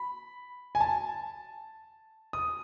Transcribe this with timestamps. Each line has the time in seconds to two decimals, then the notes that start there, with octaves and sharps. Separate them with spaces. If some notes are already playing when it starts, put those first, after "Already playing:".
Already playing: B5
0.75 G#5
0.81 A5
2.33 D#6